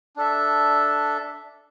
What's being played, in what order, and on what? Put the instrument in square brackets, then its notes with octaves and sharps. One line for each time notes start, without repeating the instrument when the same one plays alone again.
[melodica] D4 A4 E5